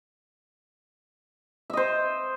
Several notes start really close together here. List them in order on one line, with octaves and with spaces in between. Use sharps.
E5 D#5 C5